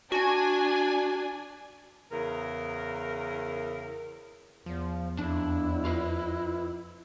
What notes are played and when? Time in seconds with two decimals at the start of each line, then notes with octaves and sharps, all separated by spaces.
0.12 D4 F#4 G#5
2.12 E2 C#3 A#4
4.66 E2 F3
5.18 F2 D4 E4
5.85 F4 B4 D#5